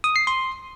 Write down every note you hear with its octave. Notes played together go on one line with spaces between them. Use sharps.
D#6
C7
C6